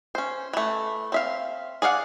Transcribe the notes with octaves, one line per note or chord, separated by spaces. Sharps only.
C#4 C5
E3 A3
C4 E5 F5
G#4 D5 F5 F#5